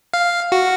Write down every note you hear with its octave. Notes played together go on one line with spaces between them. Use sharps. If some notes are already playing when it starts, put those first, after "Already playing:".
F5
F#4